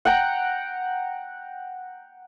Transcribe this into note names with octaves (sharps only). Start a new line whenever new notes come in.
F#5 G5 A#5